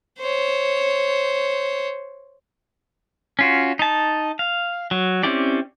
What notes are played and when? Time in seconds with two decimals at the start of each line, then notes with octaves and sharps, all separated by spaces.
0.19 C5 C#5
3.39 C#4 F4 F#4
3.79 D#4 A5
4.39 F5
4.91 F#3
5.23 C4 C#4 E4 G4 D5